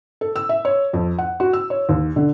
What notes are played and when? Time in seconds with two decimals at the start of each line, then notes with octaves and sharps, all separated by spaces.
0.21 A4
0.36 E6
0.49 E5
0.65 C#5
0.93 F2
1.18 F#5
1.40 F#4
1.53 E6
1.70 C#5
1.89 D#2
2.16 D3